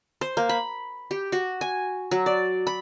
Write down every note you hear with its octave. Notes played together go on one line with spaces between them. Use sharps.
C5
A#3
B5
G4
F#4
G#5
F#3
D5
B5